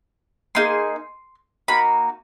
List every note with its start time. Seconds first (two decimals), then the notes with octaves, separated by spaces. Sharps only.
0.55 A#3 D#4 G#4 C6
1.68 A#3 D#4 F#4 B5